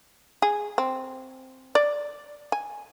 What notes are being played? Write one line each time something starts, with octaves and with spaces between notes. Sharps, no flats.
G#4
C4
D5
G#5